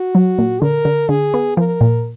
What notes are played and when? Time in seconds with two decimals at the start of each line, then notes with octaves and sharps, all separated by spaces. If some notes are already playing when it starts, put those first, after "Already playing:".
Already playing: F#4
0.15 F#3
0.39 A#2
0.62 D3 A#4
0.85 D3
1.09 D3 G#4
1.34 B3
1.57 F3 A#4
1.81 A#2